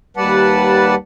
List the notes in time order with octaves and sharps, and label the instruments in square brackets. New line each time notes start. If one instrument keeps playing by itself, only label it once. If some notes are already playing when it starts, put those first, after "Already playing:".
[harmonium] D#2 G3 B4 D5 F#5 A5